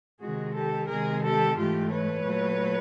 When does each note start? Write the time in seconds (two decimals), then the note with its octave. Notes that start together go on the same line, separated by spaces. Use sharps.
0.20 C3 D#3 G#3 F#4 G#4
0.54 G4 A4
0.88 C3 D#3 G#3 G#4 A#4
1.22 G4 A4
1.57 G#2 E3 A3 F4 G4
1.90 B4 C#5
2.24 A#2 F#3 A3